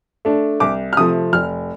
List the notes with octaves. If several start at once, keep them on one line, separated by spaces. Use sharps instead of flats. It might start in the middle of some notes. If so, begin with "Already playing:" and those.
A3 D4
C2 D6
F6
C3 F3 A3 D#6
F1 F6